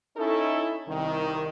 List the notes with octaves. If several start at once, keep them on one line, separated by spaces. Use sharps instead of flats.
C#4 D#4 E4 A4
C2 D#3